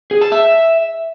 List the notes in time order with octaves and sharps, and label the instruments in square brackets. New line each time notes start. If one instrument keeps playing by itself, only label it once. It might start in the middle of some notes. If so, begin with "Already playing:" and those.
[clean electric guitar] G#4
A5
E5